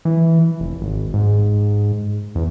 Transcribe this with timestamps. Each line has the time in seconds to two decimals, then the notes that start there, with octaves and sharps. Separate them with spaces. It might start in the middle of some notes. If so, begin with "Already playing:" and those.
0.05 E3
0.60 F1
0.81 G#1
1.14 G#2
2.35 E2